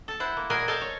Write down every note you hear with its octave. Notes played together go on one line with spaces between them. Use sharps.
A4 A5
E4 C5 F#5
A#3
A#2 F#4 G#4 A#4 D#5 G#5
A4 C5 D#5 F5 G#5 A5
C#5